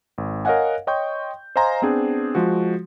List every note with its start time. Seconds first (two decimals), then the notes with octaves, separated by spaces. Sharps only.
0.18 G#1
0.45 A#4 C#5 D#5 F5 F#5 G#5
0.87 C#5 D#5 G5 C6 C#6 G6
1.56 C5 D#5 F5 G#5 A#5 C6
1.82 B3 C4 D4 G#4
2.35 F3 G#3 F#4